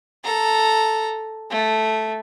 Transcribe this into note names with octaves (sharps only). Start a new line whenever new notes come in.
A4 A#5
A3